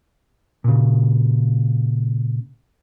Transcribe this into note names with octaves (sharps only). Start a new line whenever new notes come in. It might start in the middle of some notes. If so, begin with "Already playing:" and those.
A#2 C#3